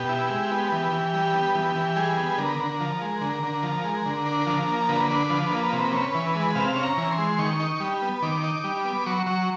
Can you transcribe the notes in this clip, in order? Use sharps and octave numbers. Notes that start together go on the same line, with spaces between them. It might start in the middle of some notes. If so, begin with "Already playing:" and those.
Already playing: B2 G4
E4
G#3
B3
E3
E3
G3
B3
E3 G4
E3
G3 G#4
B3
D3 A#4
D3
F3
G#3
D3
D3
F3
G#3
D3
D4
F3
A#3
D3 B4
D4
F3
A#3
C3
C#4
E3
G#3
C3 F5
C#4
A#5
E3
C6
G#3
D#3 C#6
D#4
G3
B3
D#3 D6
D#4
G3
B3
F#3 C#6
F#3 C#6